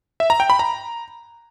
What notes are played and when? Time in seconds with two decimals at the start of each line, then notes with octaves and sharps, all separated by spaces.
0.20 E5
0.30 A#5
0.40 G5
0.50 B5
0.59 A#5